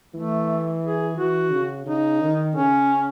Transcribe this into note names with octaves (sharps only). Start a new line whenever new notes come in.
E3 A3
G#4
E3 F#4
C#3
C#3 D#4
D#3
C#3 C#4